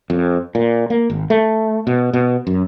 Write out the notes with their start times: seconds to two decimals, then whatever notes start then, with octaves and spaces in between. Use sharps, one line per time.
0.10 F2
0.55 A#2
0.90 A#3
1.10 G#1
1.30 A3
1.87 B2
2.13 B2
2.47 F#2